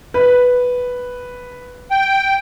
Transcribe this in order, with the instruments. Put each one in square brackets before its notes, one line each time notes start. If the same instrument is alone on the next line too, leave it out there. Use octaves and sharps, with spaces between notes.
[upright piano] B4
[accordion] G5